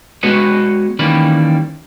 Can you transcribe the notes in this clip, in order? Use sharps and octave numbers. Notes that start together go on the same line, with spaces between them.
G#3 B3 F#4 B4 C#5 D#5
D#3 E3 G3 A#3 C#4 B5